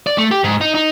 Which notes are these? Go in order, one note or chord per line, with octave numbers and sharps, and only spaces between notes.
D5
A3
G4
G#2
D#4
D#4